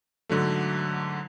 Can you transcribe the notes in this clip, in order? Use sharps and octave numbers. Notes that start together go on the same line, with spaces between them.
G#2 D3 F#3 A3